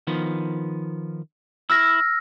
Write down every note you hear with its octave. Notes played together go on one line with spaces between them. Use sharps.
D#3 F3 B3
E4 E5 E6 F6 A#6